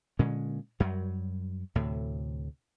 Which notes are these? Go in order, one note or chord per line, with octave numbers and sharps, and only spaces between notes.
A#2 D3 G#3 C#4
F#2 F#3 G3
D2 A2 C3